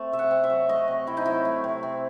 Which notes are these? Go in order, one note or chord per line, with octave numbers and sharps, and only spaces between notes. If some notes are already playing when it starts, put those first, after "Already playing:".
Already playing: A3 C4 A5
C3 E5
F#5
C4
E5
F#3
A3 D#5
C3
C4 E4
D#4
F#3 E4
A3
C3
C4